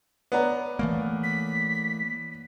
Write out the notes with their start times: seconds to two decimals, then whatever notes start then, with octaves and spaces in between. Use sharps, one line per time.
0.32 B3 C#5 D5 F#5 A#5
0.79 E3 A3 A#3
1.23 B6